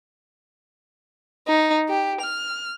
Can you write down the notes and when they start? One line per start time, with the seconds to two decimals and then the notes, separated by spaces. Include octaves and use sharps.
1.48 D#4
1.89 G4
2.21 F6